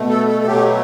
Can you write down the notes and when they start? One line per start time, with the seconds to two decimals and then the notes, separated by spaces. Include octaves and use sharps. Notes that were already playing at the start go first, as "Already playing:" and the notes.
Already playing: B2 A3
0.09 A4
0.28 A4
0.41 A4
0.46 B2 F#3 A3 G4